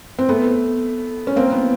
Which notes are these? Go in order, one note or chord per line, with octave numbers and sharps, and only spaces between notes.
C4
A3 B3
C#4
A#3 C4
B3